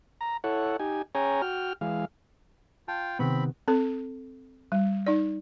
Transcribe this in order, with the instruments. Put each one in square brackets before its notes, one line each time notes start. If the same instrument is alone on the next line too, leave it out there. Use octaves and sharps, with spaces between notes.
[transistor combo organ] A#5
E4 A4 C#5 F#5
D#4 G4 G#5
C#4 G#4 C#5 G5 G#5 A#5
F#4 G5 F6
E3 G#3 F5
[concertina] F4 G5 [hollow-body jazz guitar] A5
[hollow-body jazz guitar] C3 D#3 B3 [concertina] C4 B5
[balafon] C4 A4
G3
D#4 D5